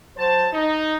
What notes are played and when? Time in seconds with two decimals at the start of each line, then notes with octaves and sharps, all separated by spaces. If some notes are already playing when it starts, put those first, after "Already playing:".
0.17 F#3 C5 A5
0.53 D#4